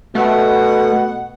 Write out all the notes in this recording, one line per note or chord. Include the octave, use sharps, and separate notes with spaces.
B2 A3 F#5